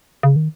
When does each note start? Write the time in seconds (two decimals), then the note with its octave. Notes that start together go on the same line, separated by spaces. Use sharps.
0.23 C#3
0.36 D#3